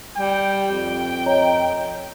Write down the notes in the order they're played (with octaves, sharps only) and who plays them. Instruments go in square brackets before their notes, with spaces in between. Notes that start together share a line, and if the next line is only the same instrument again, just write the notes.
[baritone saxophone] G3 [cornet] G5
[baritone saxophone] F2
[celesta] C#5 D#5 A#5